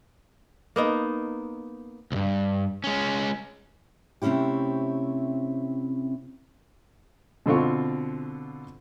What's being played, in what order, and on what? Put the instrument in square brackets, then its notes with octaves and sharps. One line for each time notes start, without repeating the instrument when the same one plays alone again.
[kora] A#3 B3 D#4
[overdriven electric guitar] C2 G2
G#3 C#4
[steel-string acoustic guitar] C3 A3 C4 C#4 E4 G4
[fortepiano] B2 D3 C4 F4 C#6